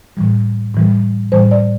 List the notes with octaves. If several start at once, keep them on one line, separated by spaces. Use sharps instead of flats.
A2 E3 G3
A2 E3 G3
A2 E3 G3 C5
D5